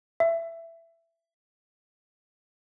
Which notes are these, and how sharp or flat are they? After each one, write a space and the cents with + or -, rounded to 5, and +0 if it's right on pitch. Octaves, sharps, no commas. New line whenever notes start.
E5 +15